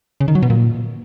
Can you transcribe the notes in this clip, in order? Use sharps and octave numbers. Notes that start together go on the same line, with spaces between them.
C#3
D#3
F#3
B2
A#2